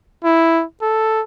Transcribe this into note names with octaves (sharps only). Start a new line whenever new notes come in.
E4
A4